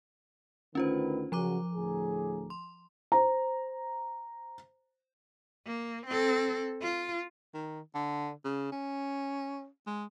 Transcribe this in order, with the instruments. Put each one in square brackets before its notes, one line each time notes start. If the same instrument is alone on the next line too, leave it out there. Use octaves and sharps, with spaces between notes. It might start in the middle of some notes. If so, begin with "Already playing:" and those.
[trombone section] D2 D#3 B4 [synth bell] C#4 F4 C5
[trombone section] C#3 F#3 [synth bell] F3 A#5 D6
[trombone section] D2 A2 G#4
[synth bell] C6
[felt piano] C5 A#5
[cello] A#3
C4 A4
F4
[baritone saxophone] D#3
D3
C#3
C#4
G#3